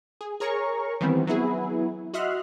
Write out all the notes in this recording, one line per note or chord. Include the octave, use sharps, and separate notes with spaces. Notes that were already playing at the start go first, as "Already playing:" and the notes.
G#4
G#4 A#4 C#5 A#5 C#6
D#3 E3 G3 B3 C4
F#3 B3 E4 G#4
F#4 D#5 E5 C6 F6 F#6